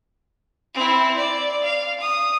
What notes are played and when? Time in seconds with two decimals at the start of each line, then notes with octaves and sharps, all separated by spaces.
0.74 C4 E4
1.17 D5
1.65 F5
2.00 D#6